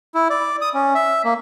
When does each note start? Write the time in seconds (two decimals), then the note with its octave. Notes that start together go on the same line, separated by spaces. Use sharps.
0.15 E4
0.30 D5
0.61 D#6
0.74 C#4
0.95 E5
1.25 A#3